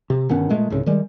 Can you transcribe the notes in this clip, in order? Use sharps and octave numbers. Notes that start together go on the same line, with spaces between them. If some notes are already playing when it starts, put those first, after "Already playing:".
C3
G1 D#3 B3 C#4
A#2 G#3 A3
C2 G#2 C#3
D#3 G3 G#3